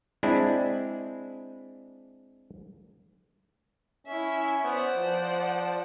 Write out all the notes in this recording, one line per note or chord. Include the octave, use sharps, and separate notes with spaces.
G#3 C4 D4 E4
C#4 E4 E5
B3 C5 D5 F#5
F3